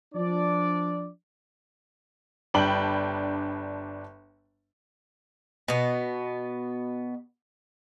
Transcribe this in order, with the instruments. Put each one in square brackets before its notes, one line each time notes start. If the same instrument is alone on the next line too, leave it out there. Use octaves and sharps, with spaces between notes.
[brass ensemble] F3 D4 D5
[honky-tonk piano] G1 D4 G5 B5 F#7
[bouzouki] B2 B3